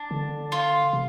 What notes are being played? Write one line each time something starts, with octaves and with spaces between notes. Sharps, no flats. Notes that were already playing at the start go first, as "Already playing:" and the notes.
Already playing: D4
D3
F4
C3